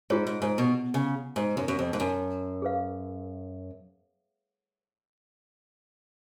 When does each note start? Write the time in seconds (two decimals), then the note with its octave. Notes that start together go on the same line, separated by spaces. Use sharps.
0.10 G#2 F4 G#4 C#5
0.27 G#2
0.42 G#2
0.58 B2
0.94 C#3
1.36 G#2
1.57 F#2
1.68 F#2
1.79 F2
1.93 G#2
2.00 F#2
2.62 G#4 B4 F5